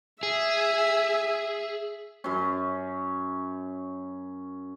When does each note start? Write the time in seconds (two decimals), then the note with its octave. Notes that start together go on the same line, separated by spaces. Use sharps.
0.23 G#4 E5
2.24 F#2 C#4